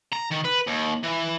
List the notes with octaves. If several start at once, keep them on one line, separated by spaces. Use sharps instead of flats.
A#5
D#3
B4
D#2
E3